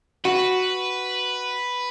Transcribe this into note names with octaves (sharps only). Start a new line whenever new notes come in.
F#4 B4